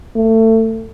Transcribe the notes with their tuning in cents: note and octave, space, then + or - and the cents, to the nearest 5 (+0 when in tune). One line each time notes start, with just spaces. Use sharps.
A3 +25